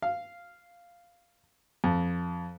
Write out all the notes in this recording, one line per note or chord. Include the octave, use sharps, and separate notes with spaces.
F5
F2